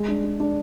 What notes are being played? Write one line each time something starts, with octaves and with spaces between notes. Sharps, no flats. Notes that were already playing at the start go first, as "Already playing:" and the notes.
Already playing: G#3
D4
D4
D4